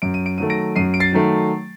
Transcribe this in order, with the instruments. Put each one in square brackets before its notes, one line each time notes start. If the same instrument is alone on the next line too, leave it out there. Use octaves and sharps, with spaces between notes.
[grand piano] F#2 D7
D#7
D7
D#3 F#3 A3 D#7
A#6 D7
F#2 C7 D#7
D7
A6 C7
D#3 F#3 A3